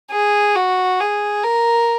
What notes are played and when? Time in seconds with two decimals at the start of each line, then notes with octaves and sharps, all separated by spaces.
0.11 G#4
0.56 F#4
1.00 G#4
1.43 A#4